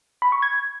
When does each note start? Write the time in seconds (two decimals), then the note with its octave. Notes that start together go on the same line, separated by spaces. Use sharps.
0.22 B5
0.32 C#6
0.42 G#6